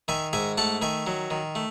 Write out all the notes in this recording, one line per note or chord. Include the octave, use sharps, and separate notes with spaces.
D#3 E5 G#5
G#2 E5 G#5
A3 F#5 A5
D#3 E5 G#5
F#3
D#3
A3